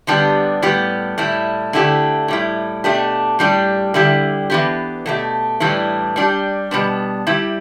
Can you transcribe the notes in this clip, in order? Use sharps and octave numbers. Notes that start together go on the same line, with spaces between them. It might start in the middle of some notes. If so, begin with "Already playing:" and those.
D3 G3 B3 D4 G4
A2 G3 B3 G4
A2 G3 E4
D3 A3 E4 G4
A2 G3 E4
B2 A3 D4 G4
A2 G3 D4 G4
D3 G3 E4 G4
E3 B3 D4 G4
B2 A3 G4
A2 E3 G3 D4
G3 D4 G4
B2 G3 B3 D4
G3 E4 G4